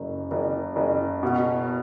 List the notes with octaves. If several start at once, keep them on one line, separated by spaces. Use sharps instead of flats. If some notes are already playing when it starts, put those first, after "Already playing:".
Already playing: F#1 F#2
F#1
F#1
B2